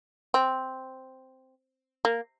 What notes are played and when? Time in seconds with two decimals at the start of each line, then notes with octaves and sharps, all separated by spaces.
0.34 C4
2.05 A#3